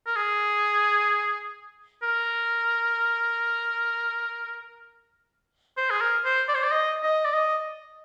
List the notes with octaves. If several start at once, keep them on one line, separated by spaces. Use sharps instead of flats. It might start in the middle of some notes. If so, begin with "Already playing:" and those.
A#4
G#4
A#4
C5
G#4
A#4
C5
D5
C5
D5
D#5
D#5
D5
D#5